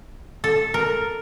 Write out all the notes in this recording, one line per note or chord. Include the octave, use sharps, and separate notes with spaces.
A4
A#4